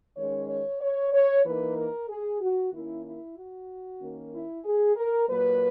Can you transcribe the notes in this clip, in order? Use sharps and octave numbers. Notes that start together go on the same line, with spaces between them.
D#3 G#3 C#4 C#5
C#5
C#5
C#5
E3 A#3 D#4 B4
A#4
G#4
F#4
D#3 A#3 C#4 E4
E4
F#4
D#3 A#3 C#4
E4
G#4
A#4
A#2 F#3 A#3 B4